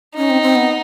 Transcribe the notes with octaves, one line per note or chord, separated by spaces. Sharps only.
C#4 D#4
C4
C4
B3